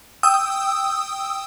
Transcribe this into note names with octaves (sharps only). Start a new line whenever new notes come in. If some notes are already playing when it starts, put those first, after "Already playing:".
G5 D#6 E6